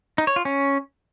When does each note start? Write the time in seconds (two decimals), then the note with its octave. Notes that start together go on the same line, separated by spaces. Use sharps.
0.18 D#4
0.27 C#5
0.36 F4
0.45 C#4